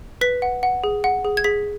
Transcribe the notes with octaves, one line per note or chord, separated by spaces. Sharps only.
B4 B6
F#5
F#5
G#4
F#5
G#4
G#6
G#4 B6